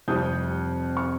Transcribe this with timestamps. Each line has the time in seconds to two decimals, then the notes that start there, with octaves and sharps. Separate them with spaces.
0.08 F1 F2 C3 G3 D#6 G6
0.97 C#6 F6